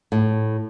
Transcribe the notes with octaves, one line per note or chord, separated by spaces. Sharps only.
A2